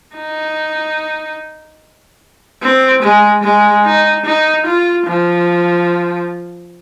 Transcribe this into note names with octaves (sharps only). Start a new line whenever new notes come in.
D#4
C4
G#3
G#3
D#4
D#4
F4
F3